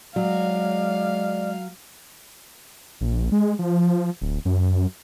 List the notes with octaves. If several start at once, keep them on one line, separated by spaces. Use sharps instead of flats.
F#3 G#3 D5 F5
A#1
G#3
F3
D1
F#2